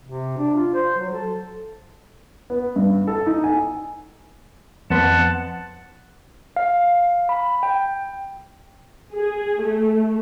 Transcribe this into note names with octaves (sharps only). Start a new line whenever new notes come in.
C3
D4
F4
C5
F#3
A4
B3
G2
A4
D#4
G#5
F2 B3 F#5 A5 C6
F5
B5
G5
G#4
A3